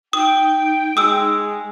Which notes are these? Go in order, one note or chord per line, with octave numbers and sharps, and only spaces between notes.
D#4 G5 D#6
G#3 D#6 E6